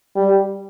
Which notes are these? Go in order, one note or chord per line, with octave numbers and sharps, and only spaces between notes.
G3